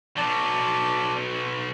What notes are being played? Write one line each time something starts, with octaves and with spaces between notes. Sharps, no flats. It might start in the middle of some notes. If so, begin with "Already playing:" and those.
B1 F#3 D5 A5